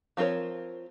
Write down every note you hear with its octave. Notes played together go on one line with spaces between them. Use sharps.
F3 C4 F4 A#4 C#5